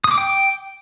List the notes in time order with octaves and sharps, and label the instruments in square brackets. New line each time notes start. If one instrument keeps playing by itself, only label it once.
[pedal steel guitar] D#6
D6
G5